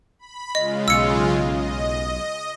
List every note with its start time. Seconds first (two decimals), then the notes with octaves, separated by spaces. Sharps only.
0.19 B5
0.55 C#3 G#3 F4 D#5
0.88 B1 E6 C#7
1.38 D#5